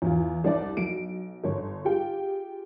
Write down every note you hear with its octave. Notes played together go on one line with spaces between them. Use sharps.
E2 F4
C2 D4 D5
B1 D7
G1 C#5
F4 G4 G#4 G5